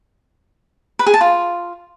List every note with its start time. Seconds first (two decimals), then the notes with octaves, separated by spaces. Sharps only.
0.99 B4
1.06 G#4
1.14 A5
1.21 F4